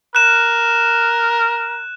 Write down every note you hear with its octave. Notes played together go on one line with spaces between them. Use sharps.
A#4 F#6 E7